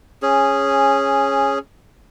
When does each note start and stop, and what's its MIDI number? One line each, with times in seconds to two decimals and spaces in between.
0.22 1.59 61
0.22 1.59 68